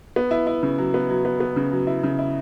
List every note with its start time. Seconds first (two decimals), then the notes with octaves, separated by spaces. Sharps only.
0.16 B3
0.31 E4
0.47 E4
0.63 C#3
0.78 F#3
0.94 B3
1.10 F#3
1.25 B3
1.40 B3
1.56 C#3
1.72 F#3
1.87 E4
2.03 C#3
2.19 E4